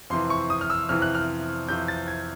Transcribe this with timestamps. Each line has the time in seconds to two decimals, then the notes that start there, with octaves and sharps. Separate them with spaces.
0.10 F2 C3 E3 C6
0.30 C#6
0.50 D#6
0.61 F6
0.70 E6
0.89 F2 C3 E3 F6
1.02 F#6
1.15 F6
1.68 F2 C3 E3 G6
1.88 A6
2.08 G#6